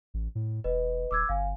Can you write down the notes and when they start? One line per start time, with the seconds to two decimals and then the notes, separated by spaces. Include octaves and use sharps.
0.14 A1
0.35 A2
0.64 E1 B4 D#5
1.11 D#1 D6 E6 G#6
1.29 G1 F5 G#5